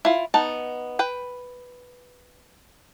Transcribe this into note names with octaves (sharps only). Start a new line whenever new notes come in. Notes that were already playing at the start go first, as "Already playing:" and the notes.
E4 F4
B3 D#4 A5
B4 G5